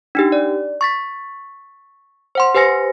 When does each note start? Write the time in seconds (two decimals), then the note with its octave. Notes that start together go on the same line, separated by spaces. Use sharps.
0.15 D4 D#4 G4
0.32 D5
0.81 C#6 A6 B6
2.35 C5 F#5 C6
2.55 G4 B4 C5 G#5 A#6 C#7